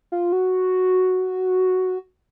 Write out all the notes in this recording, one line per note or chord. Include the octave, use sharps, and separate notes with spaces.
F4
F#4